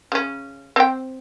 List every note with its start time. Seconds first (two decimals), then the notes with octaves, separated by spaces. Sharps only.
0.12 C#3 C#4
0.76 C4 G5